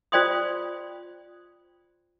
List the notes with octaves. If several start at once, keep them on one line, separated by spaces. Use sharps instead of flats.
F4 C5 D5 G5 C6 D#6